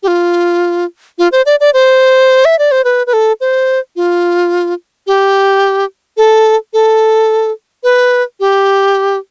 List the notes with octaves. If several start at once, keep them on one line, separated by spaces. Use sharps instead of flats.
G4
F4
F4
C5
D5
D5
C5
E5
D5
C5
B4
B4
A4
C5
F4
G4
A4
A4
B4
G4